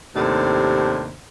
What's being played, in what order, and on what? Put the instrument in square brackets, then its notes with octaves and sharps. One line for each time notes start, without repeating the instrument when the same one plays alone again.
[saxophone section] D#2 A2 C3 D4 A4 C5